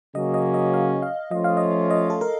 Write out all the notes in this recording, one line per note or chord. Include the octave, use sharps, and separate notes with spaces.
C#3 F#3 A#3 C#4 D#5
D#5
D#5
F5
F5
F3 A3 C#4 F4 D#5
F5
D#5
D#5
A4
A#4